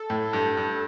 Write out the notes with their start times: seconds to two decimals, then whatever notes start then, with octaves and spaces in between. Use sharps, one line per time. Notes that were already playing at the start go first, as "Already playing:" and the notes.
Already playing: A4
0.10 A2
0.33 G2
0.57 G2